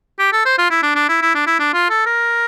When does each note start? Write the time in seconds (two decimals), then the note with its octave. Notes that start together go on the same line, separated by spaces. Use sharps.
0.19 G4
0.32 A4
0.45 C5
0.58 F4
0.70 E4
0.83 D4
0.95 D4
1.09 E4
1.22 E4
1.34 D4
1.47 E4
1.59 D4
1.73 F4
1.90 A4
2.06 A#4